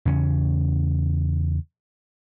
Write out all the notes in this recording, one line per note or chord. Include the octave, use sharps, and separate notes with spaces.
E2 C#3 C#4